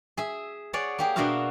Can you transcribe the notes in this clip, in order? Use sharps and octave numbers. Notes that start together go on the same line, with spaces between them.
G#4 E5
G#4 C#5 D5 F#5
A#3 G4 G#4
B2 A#3 D4 F#4 E5 F5